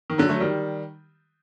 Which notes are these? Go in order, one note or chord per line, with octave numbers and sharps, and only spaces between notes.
D#3
D3 F#3
F#3 A3
D#3 G3